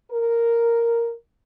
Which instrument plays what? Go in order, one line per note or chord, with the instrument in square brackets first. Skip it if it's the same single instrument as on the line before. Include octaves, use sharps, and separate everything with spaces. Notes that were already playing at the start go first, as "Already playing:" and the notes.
[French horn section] A#4